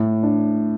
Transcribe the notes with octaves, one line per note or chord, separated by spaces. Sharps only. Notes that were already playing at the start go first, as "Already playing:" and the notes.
Already playing: A2
D4